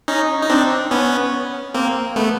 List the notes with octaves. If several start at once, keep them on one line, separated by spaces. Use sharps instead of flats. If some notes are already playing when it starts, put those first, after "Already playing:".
C#4 D#4
D#4
C4 D4
B3 C#4
A#3 C4
A3 B3